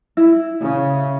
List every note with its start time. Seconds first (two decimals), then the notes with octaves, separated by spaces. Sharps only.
0.17 E4
0.61 C#3